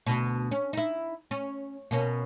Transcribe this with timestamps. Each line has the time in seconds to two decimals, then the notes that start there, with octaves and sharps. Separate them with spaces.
0.06 D2 B2
0.51 C#4
0.73 D#4 E4
1.31 C#4
1.91 B2 A#3 C#4